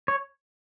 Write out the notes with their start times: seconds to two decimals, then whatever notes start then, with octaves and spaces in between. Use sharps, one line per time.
0.08 C#5